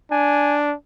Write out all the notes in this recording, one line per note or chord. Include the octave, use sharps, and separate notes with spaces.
D4 G#5